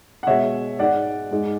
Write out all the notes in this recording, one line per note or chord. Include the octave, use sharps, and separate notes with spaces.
F#5
B2 G#3 C#5 E5
G#2 G#3 D5 F#5
G#2 G#3